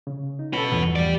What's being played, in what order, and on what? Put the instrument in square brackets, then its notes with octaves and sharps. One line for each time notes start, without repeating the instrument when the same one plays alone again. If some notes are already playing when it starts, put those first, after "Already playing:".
[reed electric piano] C#3
D#4
[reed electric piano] C#4 E4 A4 [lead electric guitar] F#4 B4
[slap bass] A1 E2 F3 [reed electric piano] G2 F#5
[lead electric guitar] G4 D5